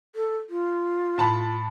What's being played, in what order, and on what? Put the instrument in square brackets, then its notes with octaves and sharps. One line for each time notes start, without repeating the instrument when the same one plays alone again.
[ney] A4
F4
[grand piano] A2 A5 B5